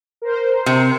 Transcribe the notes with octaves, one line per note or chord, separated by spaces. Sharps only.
A#4 C5
C3